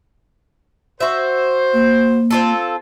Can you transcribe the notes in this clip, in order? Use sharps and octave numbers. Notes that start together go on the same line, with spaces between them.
F#4 C5 E5
A#3
C4 F4 A4